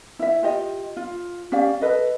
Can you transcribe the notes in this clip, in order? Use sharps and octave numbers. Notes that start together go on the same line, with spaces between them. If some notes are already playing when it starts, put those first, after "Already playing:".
E4 E5
F4 G4 D#5
F4
C#4 G4 D5 F5
A4 B4 D#5